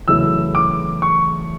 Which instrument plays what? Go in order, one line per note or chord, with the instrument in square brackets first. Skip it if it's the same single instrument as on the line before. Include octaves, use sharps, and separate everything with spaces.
[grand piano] E2 C#3 F#3 A3 E4 [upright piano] E6
[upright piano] D6
C#6